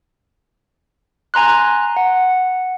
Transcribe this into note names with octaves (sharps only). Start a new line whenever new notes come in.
G#5 A#5 C6 F#6
F#5